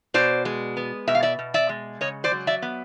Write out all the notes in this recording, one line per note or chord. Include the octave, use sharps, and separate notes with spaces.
B2 C5 D5
G#3
B3
B2 E5
F5
D5 E5
B2
D5 E5
G#3
C#3 C#5 D#5
C5 D5
F#3
D5 E5
B3